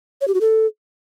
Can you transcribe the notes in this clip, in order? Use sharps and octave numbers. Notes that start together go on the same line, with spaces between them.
C#5
G4
F#4
A4